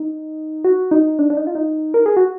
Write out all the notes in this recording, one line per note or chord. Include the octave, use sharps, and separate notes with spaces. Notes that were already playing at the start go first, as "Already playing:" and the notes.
Already playing: D#4
F#4
D#4
D4
D4
D#4
F4
D#4
A#4
G#4
F#4